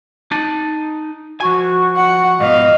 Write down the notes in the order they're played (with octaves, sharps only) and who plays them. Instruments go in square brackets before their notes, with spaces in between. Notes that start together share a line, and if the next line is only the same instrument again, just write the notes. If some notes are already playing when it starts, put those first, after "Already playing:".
[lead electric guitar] D#4 A5
[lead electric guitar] F3 G#5 [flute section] F#4 C#6
[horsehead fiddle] F#5
[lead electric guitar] G#2 B2 [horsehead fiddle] D#5 F5